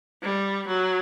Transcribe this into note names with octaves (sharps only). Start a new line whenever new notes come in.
G3
F#3